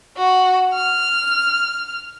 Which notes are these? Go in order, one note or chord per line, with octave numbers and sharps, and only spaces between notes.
F#4
F6